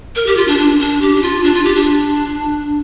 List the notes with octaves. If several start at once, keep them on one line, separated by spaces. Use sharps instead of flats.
A#4
G4
F4
D4
D4
D4
G4
D4
F4
D4
F4
G4
D4